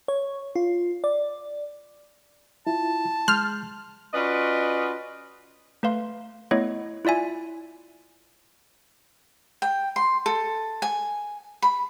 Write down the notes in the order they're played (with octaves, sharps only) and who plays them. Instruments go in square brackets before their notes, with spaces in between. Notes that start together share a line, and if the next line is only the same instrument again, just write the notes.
[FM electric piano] C#5
F4
D5
[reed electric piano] E4 F4 [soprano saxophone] A5
[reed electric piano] G#3 C6 G6 [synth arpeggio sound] F6
[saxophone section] C#4 F4 F#4 B4 D5 D#5
[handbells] A3 B4 F5 C6
A3 B3 E4 C#5 D#5
E4 F4 D5 E5 G#5
[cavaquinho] G5
C6
A4
G#5
B5